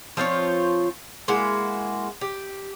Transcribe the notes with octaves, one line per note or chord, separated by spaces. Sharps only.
F3 C4 F4 C#5
G#3 A#3 E4 F#4
G4